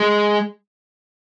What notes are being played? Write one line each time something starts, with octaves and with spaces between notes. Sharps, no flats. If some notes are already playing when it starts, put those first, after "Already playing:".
Already playing: G#3